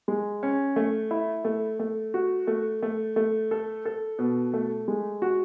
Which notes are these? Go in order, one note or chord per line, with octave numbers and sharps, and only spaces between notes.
G#3
C#4
A3
E4
A3
A3
F#4
A3
A3
A3
A4
A4
B2
A3
G#3
F#4